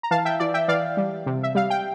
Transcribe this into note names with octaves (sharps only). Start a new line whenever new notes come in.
A#5
E3 F5 A5
E5 G5
E3 D5
E5 G5
E3 D5 F5
G3
C3
E5
G3 F5
G5